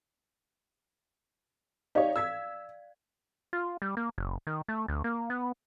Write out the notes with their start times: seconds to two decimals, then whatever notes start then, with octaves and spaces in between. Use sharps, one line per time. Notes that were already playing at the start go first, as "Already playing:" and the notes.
1.95 D#4 G4 C#5 D5 F5
2.16 E6 G#6 B6
3.53 F4
3.82 G3
3.97 A#3
4.18 F#1
4.47 D#3
4.68 A3
4.88 D2
5.04 A#3
5.30 B3